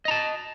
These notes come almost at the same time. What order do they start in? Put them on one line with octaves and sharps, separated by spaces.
D#5 A#5 A5